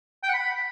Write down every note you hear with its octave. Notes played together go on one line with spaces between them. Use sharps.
G5
F#5
B5